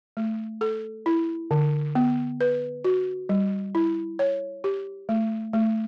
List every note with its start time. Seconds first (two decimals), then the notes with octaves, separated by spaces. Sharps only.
0.17 A3
0.61 A4
1.06 E4
1.51 D3
1.95 B3
2.41 B4
2.84 F#4
3.29 G3
3.75 E4
4.19 C#5
4.64 G4
5.09 A3
5.53 A3